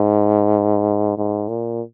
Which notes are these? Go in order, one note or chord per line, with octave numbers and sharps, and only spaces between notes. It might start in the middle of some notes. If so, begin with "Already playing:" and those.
Already playing: G#2
G#2
A#2